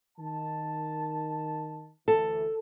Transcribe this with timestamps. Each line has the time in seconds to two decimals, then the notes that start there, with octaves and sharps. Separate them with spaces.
0.18 D#3 A5
2.08 D2 E3 A4